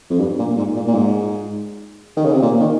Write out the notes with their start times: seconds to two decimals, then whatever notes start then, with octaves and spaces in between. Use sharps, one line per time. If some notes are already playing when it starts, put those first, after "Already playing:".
0.10 F2
0.20 G2
0.39 A#2
0.57 G#2
0.76 A#2
0.87 A#2
0.94 G#2
2.16 D#3
2.25 C#3
2.33 C3
2.42 A#2
2.59 D#3